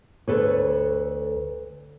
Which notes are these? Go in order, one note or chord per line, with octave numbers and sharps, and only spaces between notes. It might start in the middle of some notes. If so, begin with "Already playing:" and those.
D2 A4 B4 C#5